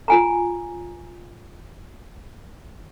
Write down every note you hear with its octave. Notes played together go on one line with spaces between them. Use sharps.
F4 G#5 A#5